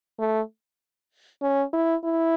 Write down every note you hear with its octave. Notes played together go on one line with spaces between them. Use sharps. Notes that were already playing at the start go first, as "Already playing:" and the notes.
A3
C#4
E4
E4